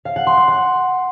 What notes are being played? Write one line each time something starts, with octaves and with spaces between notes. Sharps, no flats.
F5
F#5
C6
F#6
F#5